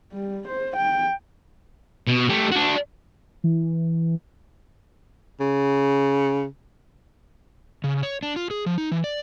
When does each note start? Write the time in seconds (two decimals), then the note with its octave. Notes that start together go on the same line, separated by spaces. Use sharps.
0.12 G3
0.47 C5
0.76 G5
2.08 B2
2.30 A3 G4
2.52 D4 F#4
3.44 E3
5.40 C#3
7.84 C#3
8.03 C#5
8.23 D4
8.36 F4
8.51 G#4
8.66 F3
8.78 D#4
8.91 E3
9.04 D5